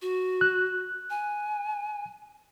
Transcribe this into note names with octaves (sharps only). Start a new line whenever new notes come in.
F#4
F#6
G#5